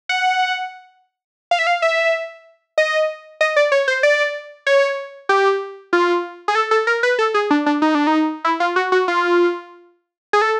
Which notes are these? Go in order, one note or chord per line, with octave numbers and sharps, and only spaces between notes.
F#5
F5
E5
F5
E5
D#5
D#5
D5
C#5
C5
D5
C#5
G4
F4
G#4
A4
A4
A#4
B4
A4
G#4
D4
D4
D#4
D4
D#4
E4
F4
F#4
F#4
F4
G#4
A4